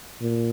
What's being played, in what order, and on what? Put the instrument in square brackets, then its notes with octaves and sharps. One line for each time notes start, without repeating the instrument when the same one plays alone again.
[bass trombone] A#2